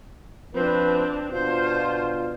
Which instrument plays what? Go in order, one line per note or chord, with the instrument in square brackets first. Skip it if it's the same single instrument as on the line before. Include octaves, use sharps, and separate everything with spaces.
[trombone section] F3 B4 [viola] C4 D4
[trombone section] B2 D4 F4 [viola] C5